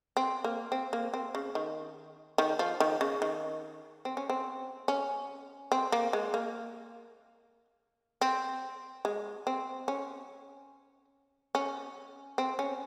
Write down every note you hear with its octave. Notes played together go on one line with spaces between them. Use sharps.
C4
A#3
C4
A#3
C4
C#3
D#3
D#3
F3
D#3
C#3
D#3
C4
C#4
C4
C#4
C4
A#3
G#3
A#3
C4
G#3
C4
C#4
C#4
C4
C#4